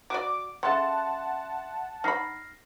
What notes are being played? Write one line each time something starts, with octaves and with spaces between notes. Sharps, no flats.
F#4 D5 D6
C#3 A4 E5 F#5 A5 C6
D#4 B5 F6 A#6 C7